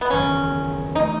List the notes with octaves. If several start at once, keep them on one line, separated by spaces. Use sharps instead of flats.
B3
F#1 E2 D#3 F#3 C#4
E3 A3 D#4